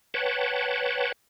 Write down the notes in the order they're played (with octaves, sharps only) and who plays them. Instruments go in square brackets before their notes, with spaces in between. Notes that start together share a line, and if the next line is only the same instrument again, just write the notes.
[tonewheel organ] B4 C#5 F#5 G5 A5